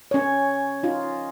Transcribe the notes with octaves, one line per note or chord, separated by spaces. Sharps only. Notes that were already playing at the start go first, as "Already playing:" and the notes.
C#4 C#5
D#4 F4